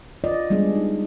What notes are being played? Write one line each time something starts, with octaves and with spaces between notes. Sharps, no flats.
F4 D5 D#5
G3 G#3 B3 D4 G#4
D#4